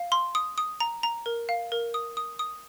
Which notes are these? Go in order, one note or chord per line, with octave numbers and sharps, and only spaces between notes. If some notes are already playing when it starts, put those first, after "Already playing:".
Already playing: F5
C6
D#6
D#6
A#5
A#5
A#4
F5
A#4
D#6
D#6
D#6